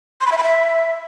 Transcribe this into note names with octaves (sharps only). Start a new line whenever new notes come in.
C6
B5
E5
B5
E5